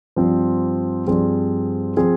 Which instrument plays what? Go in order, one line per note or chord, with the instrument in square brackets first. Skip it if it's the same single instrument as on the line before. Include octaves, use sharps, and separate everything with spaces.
[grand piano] G2 F3 C4 F4 C5
G2 F3 C4 F4 G#4
F3 C4 F4 G#4